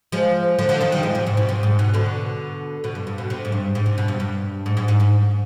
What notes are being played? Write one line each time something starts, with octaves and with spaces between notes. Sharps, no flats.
F3 G#3
D3 F3
D3 F3
C3 D#3
D#3 G3
F3 G#3
C3
G#2
B2
C3
G#2
B2
B2 D3
B2
G2
G2
B2
C3
G#2
G2
G#2
C3
B2
G2
G2
G#2
G#2
G#2
G#2